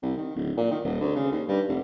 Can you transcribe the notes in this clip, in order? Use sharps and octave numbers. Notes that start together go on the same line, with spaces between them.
C2
D#3
D1
A#2
D#3
D#1
D2
C#3
D#2
G2
F1